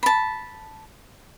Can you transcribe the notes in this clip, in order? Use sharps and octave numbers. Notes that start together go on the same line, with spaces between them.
A5 B5